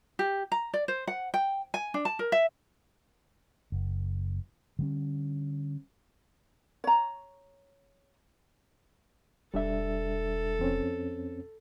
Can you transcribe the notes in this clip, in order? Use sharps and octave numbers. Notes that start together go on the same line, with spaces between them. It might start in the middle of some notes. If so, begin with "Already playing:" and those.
G4
A#5
D5
C5
F#5
G5
G#5
D4
A5
A#4
E5
F#1
D3 G3 C#4
C#5 A#5
E1 G3 D4 A4 E5
F2 C4 C#4